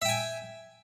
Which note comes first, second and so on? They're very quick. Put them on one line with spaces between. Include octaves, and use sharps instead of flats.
E5 G5 G#5